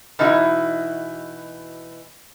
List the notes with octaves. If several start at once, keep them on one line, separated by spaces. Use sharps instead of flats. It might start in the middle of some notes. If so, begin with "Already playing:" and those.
B2 E3 D#4 E4 F#4